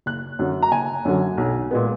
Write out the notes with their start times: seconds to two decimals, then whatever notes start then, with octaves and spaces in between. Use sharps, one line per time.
0.06 F#1 F#6
0.39 F#2 D3 F#3
0.63 A#5
0.72 F#1 G#5
1.05 F#2 D3 F#3
1.37 B1
1.71 A#2 G#3 B3